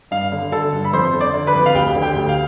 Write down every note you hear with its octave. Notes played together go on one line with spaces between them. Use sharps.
G2 F5
D3
D3 A4 A5
G2
B5
F2 C5 C6
D3
D5 D6
D3
B4 B5
F2
F5
D2 G4 G5
D3
G4 G5
D2
F5